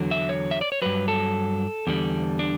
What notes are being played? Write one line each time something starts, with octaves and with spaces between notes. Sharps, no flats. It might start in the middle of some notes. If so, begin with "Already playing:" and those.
Already playing: E2 D3 F#3
E5
C#5
E5
D5
C#5
G2 F#3 B4
A4
E2 D3 G3
D4